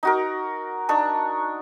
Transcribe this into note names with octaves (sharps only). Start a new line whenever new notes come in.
D#4 F#4 A#4
D4 D#4 C#6